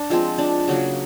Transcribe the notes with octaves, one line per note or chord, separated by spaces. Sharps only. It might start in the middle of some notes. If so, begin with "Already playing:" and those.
Already playing: D4
F3 G#3 C4
D4
C#3 F#3 A#3